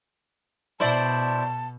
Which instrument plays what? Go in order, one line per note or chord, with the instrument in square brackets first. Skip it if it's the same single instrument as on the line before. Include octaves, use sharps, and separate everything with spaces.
[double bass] B2 [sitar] E4 C5 D5 [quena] A5